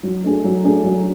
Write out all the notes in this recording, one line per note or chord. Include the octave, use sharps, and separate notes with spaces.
F#3
A3 D4 G#4
F#3
A3 D4 G#4
F#3